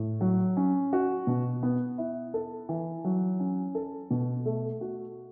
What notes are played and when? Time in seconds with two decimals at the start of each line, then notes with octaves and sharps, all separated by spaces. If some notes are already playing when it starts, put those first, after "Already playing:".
Already playing: A2
0.21 F#3
0.57 C#4
0.93 F#4
1.27 B2
1.63 B3
1.98 E4
2.34 A4
2.69 E3
3.04 F#3
3.40 C#4
3.75 A4
4.11 B2
4.46 A3
4.81 F#4